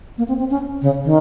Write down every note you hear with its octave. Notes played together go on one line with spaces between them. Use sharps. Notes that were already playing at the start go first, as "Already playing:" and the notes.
A#3
C4
C4
C#4
C#3
D#3